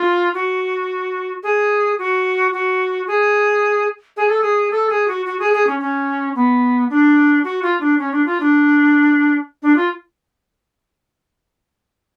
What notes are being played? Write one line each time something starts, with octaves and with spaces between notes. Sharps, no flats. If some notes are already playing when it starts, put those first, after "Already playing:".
Already playing: F4
F#4
G#4
F#4
F#4
G#4
G#4
A4
G#4
A4
G#4
F#4
F#4
G#4
G#4
C#4
C#4
B3
D4
F#4
F4
D4
C#4
D4
F4
D4
D4
F4